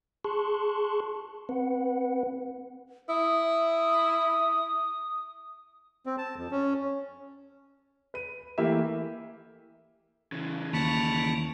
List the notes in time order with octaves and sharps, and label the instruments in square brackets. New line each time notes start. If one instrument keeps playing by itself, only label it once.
[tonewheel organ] G#4 A5 C6 C#6 F#6
C4 B4 F#5
[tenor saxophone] E4 [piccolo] D#6
[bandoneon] C4
A5
F2
C#4
[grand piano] B4 D#7
E3 A3 A#3 E4 G4 E5
[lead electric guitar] C#3 E3
[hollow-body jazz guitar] D#2 [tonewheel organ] A#3 [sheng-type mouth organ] A5 B5 C#6